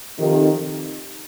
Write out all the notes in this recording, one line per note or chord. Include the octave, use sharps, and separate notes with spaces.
F2 C3 D#3